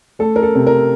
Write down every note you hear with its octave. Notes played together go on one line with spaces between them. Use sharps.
A3 A4
A#4
A4
C3
A#4